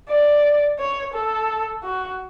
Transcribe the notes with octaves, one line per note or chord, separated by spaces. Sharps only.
D5
C#5
A4
F#4